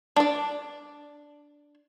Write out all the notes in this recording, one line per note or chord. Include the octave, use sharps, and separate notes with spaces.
D4 D5